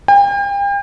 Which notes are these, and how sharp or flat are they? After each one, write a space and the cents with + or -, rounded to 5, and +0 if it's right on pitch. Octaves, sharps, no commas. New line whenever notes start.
G5 +40